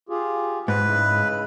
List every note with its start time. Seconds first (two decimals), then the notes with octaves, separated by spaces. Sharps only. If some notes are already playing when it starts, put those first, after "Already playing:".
0.09 F4 G4 G#4
0.68 G#2 B4 C5
0.85 C#3 G#3 E4